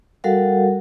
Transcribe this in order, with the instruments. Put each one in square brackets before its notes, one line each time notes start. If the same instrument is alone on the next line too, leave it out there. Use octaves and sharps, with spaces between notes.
[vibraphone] G3 F#4 A4 A#4 F5 F#5